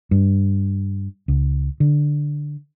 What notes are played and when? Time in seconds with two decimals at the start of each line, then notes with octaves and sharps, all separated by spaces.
0.11 G2
1.28 C#2
1.80 D3